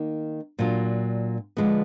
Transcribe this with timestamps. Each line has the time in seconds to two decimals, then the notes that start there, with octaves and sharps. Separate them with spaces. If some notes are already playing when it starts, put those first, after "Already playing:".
Already playing: D#3 A#3 D#4
0.59 A#2 F#3 D4 F4
1.57 D3 F3 G#3 B3